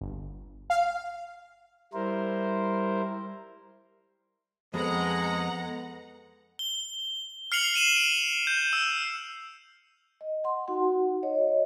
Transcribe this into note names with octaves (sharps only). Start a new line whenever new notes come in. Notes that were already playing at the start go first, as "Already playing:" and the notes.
G1
F5
G3 E4 A#4 C5
F2 G#3 B3 A4 B4 F#5 A#5
G7
F6 C7 C#7 F7 F#7
C7 D#7 E7 F#7
D7
G6
E6
D#5
F#5 C6
D#4 F#4 F#5
C#5 D#5